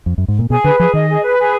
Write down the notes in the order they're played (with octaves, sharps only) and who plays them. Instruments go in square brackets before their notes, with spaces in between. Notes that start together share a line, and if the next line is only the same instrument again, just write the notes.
[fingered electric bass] F2
F#2
G#2
A#2
[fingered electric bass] B2 [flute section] G#4
[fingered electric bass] D3 [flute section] B4
[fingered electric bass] F3 [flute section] G#4
[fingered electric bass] D#3 [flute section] D#5
[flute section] G#4
B4
G#4